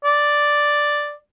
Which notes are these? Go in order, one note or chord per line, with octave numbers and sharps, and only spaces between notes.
D5